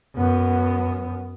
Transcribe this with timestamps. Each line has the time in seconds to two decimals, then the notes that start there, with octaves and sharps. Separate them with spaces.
0.15 F#2 B3